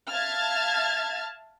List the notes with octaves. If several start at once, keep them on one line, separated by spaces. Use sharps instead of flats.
E5 F5 A5 F6 G#6 A6